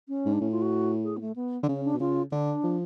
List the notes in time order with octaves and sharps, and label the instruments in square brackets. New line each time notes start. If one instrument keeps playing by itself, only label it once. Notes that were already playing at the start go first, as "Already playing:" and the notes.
[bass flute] C#4
[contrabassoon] G#2
[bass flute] D4
[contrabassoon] A2 [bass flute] C#4
[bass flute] F4
F#4
G#4
B3
A3
B3
[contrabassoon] D3
[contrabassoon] C#3 [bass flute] C#4
[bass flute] D4
[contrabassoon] B2
[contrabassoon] C#3 [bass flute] F4
[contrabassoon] D3 [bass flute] D4
[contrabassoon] F3